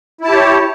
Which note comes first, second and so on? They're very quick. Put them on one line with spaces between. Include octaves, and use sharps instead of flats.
E4 A5 G4 C#5